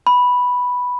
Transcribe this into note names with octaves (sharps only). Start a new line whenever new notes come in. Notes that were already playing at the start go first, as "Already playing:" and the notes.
B5